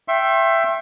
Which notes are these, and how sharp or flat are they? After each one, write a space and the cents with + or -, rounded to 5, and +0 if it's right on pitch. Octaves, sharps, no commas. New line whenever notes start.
E5 +15 G5 -10 C6 +45